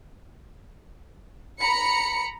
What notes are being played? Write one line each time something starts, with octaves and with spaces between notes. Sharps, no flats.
A#5 B5 C#7